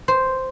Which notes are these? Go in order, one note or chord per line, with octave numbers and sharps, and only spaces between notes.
C5